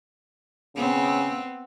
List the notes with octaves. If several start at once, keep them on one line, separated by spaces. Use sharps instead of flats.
C#3 B3 C4